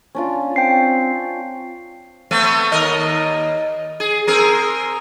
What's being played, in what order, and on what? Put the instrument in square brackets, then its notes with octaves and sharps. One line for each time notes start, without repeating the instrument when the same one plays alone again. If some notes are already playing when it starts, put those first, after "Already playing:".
[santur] C#4 D4 F4
[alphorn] C4 [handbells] G5 C7
[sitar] A3 B3 C4
D#2 A#4 D#5
G#4
C4 G#4 A#4